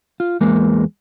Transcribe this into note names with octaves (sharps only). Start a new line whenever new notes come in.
F4
E2 G#3 A#3